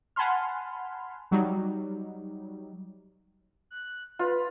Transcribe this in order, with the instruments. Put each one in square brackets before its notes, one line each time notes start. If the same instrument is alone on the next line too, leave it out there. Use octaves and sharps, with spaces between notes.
[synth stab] F#5 G#5 A5 B5 C6 F6
F#3 G3 D#4
[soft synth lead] F#6
[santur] F4 [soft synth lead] B4